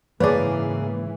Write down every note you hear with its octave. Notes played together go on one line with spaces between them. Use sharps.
G#2 C#3 E3 A#3 G#4 B4 C#5 D5